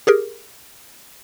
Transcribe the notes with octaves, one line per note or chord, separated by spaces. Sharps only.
G4 G#4 A#4